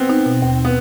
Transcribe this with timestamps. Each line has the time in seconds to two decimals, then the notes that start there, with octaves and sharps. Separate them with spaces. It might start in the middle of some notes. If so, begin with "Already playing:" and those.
Already playing: B3 C4
0.10 D#4
0.26 B2
0.42 D#2
0.65 B3